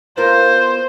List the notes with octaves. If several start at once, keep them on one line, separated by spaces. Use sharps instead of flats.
B3 F4 A#4 C5